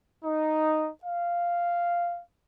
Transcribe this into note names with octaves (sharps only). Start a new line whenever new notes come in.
D#4
F5